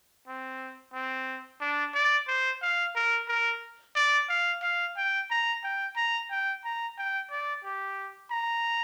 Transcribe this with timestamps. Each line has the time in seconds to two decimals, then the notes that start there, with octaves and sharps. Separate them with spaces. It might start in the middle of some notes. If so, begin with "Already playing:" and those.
0.28 C4
0.94 C4
1.61 D4
1.94 D5
2.28 C5
2.62 F5
2.96 A#4
3.28 A#4
3.96 D5
4.29 F5
4.62 F5
4.97 G5
5.31 A#5
5.64 G5
5.96 A#5
6.31 G5
6.65 A#5
6.98 G5
7.31 D5
7.64 G4
8.31 A#5